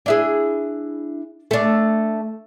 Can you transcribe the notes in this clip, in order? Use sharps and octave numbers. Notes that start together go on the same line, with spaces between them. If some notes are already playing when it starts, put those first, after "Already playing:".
D4 E4 G#4
A3 D4